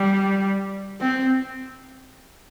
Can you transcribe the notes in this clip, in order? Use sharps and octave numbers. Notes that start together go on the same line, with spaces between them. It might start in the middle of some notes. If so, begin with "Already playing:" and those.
Already playing: G3
C4